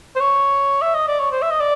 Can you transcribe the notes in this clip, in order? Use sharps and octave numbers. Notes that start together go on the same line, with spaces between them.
C5
C#5
E5
D#5
D5
C#5
C5
E5
D#5
D5